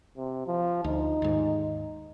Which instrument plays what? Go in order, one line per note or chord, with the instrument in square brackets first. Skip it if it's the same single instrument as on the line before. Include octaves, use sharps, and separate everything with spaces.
[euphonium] C3
F3
[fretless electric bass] D2 [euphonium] D#4
[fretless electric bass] D#2 G#2